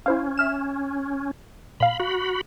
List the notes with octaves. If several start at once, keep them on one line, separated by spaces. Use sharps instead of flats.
C#4 E4 C5 F5
E5 F6 E7
A#2 F5 B5
F#4 B5